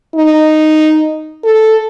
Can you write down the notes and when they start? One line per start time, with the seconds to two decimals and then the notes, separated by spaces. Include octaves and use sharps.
0.15 D#4
1.44 A4